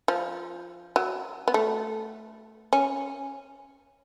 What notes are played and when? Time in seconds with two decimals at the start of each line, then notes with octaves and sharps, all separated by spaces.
0.08 F3
0.96 F#3
1.48 B3
1.54 A3
2.73 C#4